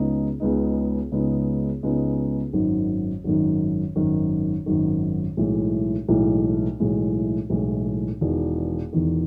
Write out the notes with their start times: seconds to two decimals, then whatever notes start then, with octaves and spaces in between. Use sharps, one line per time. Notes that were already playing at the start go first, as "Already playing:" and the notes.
Already playing: C#2 C#3 G#3 B3 D#4
0.40 C#2 C#3 G#3 B3 D#4
1.12 C#2 C#3 G#3 B3 D#4
1.83 C#2 C#3 G#3 B3 D#4
2.53 G#1 F#2 D#3
3.24 G#1 F#2 D#3
3.96 G#1 F#2 D#3
4.66 G#1 F#2 D#3
5.37 B1 A2 E3 G#3
6.09 B1 A2 E3 G#3
6.80 B1 A2 E3 G#3
7.50 B1 A2 E3 G#3
8.21 E1 E2 D#3
8.93 E1 E2 D#3